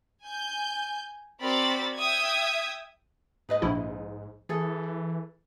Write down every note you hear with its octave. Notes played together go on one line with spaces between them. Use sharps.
G#5 G6
C4 F#4 A#4 D5 B5 A6
E5 G5 D#6 G#6
G#2 D#4 B4 D#5
A#1 E4
E3 G#4 A4